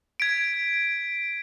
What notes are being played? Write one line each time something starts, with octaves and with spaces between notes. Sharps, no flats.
G#6 B6 D7